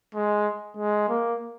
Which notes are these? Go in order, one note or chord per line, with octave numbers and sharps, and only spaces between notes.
G#3
G#3
A#3